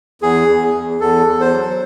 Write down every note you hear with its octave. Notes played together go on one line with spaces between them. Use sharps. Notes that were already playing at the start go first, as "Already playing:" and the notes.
E2 G#4
E2
E2
E2 A4
E2
C5
F#3